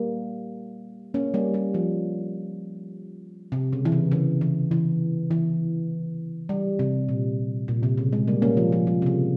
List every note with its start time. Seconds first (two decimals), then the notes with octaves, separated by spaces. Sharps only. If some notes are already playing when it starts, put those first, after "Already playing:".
Already playing: G3 A#3
1.14 A#3 C#4
1.34 G3 A#3
1.54 G3
1.74 F3
3.52 C3
3.73 C#3
3.85 E3
3.92 C#3
4.12 C#3
4.41 E3
4.71 E3
5.31 E3
6.49 G3
6.79 C3
7.09 A#2
7.68 A#2
7.83 C3
7.98 C#3
8.13 G#3
8.27 G3 A#3
8.42 A#3 C#4
8.57 F3
8.72 F3
8.87 F3
9.02 C3
9.06 C#3